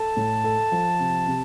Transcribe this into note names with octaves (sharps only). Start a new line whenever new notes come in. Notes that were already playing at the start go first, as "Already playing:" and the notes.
Already playing: A4 A5
A2
A4
F3
C3
C3